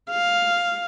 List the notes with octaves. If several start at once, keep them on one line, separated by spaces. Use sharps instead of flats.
F5